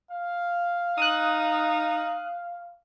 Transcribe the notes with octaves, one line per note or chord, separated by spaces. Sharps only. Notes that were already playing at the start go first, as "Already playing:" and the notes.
F5
D#4 D#6 F#6